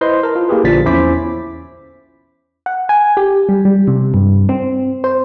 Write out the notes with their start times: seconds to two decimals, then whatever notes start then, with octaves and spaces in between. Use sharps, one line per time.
0.01 E4 B4 C5 D#5 C6
0.23 A#4 A5
0.35 F4
0.48 A#3 E4 G4 G#4 B4
0.64 A#1 A#2 D3 F3 A6 B6
0.85 E2 C#4 E4 C5 D6 B6
2.66 F#5
2.89 G#5
3.17 G4
3.49 G3
3.65 G3
3.87 C3
4.14 G2
4.49 C4
5.04 C5